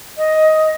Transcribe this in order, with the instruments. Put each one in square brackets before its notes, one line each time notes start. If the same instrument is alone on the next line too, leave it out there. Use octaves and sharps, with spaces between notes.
[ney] D#5